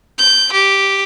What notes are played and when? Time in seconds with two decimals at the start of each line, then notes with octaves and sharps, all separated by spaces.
0.18 G6
0.53 G4